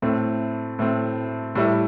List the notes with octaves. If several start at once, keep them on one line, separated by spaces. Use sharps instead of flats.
A2 A3 C4
A2 A3 C4
A2 G3 E4 A4